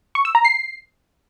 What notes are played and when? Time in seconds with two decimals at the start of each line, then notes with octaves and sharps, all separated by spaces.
0.15 C#6
0.25 E6
0.35 A#5
0.45 C7